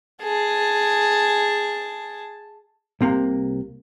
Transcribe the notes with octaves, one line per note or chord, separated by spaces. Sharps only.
G#4 A5
C2 C3 A#3